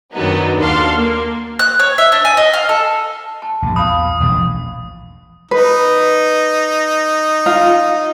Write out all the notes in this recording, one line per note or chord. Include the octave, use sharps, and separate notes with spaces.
F#2 D#3 F#3 B3 D4 D#4
D#2 D4 F#4 A4 F5 C6
A#3
F#6
C#5
E5
D4
G#5
D#5
F5
A4
A5
A#1 G2
E2 F5 B5 D#6
E1 A#1 A2
D#4 B4
F4